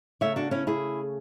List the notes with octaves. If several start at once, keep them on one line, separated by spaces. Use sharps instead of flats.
C#3 F#3 A3 C#5 E5
D4 F#4
C#4 E4
E4 G#4